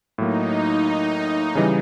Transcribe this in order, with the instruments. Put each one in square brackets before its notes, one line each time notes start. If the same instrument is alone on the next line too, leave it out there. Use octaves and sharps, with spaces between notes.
[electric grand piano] A2 F#3 A#3 [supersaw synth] D#4
[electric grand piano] C#3 E3 G3